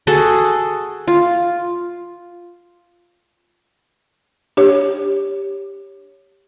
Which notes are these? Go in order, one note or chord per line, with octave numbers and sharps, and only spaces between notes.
F#4 G#4 A4
F4
D4 G4 C#5